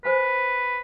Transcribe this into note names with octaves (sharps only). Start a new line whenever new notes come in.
B4 C5 G#5 B5